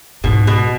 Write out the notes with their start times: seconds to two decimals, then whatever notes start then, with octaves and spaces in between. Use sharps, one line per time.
0.24 G#2 B2
0.47 B2